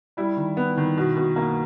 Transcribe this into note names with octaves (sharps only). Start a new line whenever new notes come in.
G3 E4
D#3
B3
D#3
B2
B2
A#3